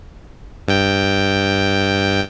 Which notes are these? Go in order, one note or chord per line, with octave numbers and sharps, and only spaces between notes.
G2 G5